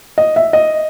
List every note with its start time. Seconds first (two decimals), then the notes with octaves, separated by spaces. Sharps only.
0.18 D#5
0.36 E5
0.53 D#5